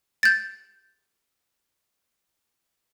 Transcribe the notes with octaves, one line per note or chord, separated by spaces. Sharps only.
G6 A6